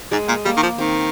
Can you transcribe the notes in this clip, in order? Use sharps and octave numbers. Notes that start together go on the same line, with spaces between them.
G#2 G#3
A#2
G3 A#3
D#3
F3
D#3 C4